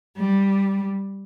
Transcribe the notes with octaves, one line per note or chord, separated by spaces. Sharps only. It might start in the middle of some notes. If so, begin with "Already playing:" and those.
G3